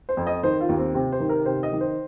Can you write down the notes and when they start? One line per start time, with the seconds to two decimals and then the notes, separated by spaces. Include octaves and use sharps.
0.09 C5
0.17 F2
0.27 D#5
0.43 D#3 C5
0.61 F4
0.69 D#2
0.78 C4
0.94 C3 C4
1.12 C5
1.20 D#3
1.29 A#4
1.46 C3 C5
1.63 D#5
1.72 D#3
1.81 C5